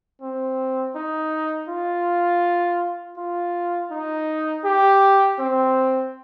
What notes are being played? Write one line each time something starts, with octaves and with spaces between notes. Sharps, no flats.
C4
D#4
F4
F4
D#4
G4
C4